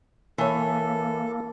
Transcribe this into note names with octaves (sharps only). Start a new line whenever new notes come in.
E3 A#3 A4 C#5